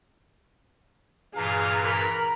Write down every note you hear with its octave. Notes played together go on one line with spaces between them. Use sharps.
G2 A#2 E3 G#4 F5 A#5
A#4 B5